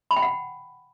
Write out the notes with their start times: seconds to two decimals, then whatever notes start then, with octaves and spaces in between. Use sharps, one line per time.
0.11 B5
0.16 G5
0.22 F#5